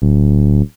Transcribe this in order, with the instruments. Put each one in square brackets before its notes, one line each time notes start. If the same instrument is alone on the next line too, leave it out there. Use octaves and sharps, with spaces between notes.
[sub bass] D1